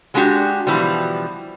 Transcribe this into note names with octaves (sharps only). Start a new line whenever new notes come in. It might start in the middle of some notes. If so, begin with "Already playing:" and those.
F#3 G#3 A3 D4 F#4 G4
B2 E3 F3 G3